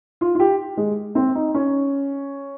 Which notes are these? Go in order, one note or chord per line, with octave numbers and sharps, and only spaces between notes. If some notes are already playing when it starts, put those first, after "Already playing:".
F4
F4
G4
G#3
C4
D#4
C#4